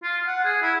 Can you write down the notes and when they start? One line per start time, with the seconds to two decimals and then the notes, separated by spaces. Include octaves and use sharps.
0.03 F4
0.27 F#5
0.44 G#4
0.62 E4